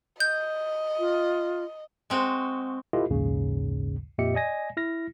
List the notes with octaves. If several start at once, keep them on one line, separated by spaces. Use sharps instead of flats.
D#5 G6
F4
G#3 C4 F#4
E4 F4 G4 A4 B4 D#5
A#1 D#2 G#2 C#3
F2 A#2 G4 D#5 E5 C#7
D5 D#5 G#5 A#6
E4 F6 A#6